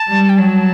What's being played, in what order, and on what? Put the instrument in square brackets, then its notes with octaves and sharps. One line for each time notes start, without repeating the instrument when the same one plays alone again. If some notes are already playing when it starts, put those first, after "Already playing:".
Already playing: [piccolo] A5
[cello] G3
[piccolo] G5
[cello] F#3 [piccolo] A5